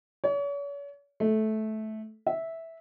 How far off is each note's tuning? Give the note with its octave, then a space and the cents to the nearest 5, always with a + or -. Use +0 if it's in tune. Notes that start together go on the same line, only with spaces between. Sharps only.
C#5 +40
A3 -15
E5 -10